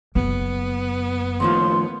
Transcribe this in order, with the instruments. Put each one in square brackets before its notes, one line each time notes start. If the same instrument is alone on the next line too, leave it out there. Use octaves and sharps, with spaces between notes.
[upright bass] F#1 [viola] B3
[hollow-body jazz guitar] D#2 A2 F3 [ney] C6